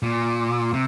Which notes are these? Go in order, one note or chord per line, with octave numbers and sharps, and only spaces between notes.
A#2
C3